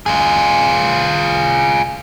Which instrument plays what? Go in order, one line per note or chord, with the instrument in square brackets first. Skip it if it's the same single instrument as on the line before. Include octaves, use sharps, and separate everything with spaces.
[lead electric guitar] F4 G#4